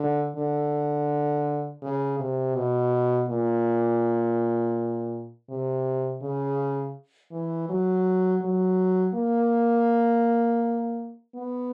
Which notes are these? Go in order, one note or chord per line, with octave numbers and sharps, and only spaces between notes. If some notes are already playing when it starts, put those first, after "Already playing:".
Already playing: D3
D3
C#3
C3
B2
A#2
C3
C#3
E3
F#3
F#3
A#3
B3